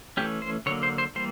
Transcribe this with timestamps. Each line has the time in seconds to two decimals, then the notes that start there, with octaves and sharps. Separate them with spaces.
0.17 E3 A3 C#4 G4
0.42 C5
0.66 D3 F#3 A#3 C#5
0.83 C5
0.98 C5
1.15 E3 G3 A#3 C5